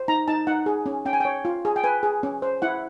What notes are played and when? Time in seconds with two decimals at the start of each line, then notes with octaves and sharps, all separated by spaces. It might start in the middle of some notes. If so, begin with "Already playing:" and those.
Already playing: C5
0.08 D#4 A#5
0.28 D#4 A5
0.47 D#4 F#5
0.66 G#4
0.86 C#4
1.05 C#4 G5
1.13 G#5
1.20 C#5 G5
1.45 F4
1.65 G#4
1.76 G5
1.84 B4 G#5
2.03 G#4
2.23 C#4
2.42 C5
2.62 E4 F#5